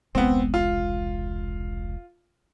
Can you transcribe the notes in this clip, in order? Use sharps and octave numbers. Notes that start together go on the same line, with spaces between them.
E1 C2 G#3 B3 C4
F4